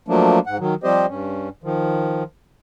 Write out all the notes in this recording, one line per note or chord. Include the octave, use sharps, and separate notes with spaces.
F3 F#3 A3 A#3 D4
G#2 F#5
D#3 F#3
F3 G3 C4 G4 C5 D#5
G2 C#4
D#3 F3